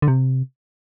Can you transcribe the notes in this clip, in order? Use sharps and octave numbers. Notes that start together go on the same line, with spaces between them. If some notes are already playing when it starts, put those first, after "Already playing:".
D3
C3